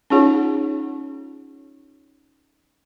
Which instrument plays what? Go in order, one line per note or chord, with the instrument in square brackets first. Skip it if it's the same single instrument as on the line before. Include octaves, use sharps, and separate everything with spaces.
[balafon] C#4 D#4 F4 G#4 C#5 F#5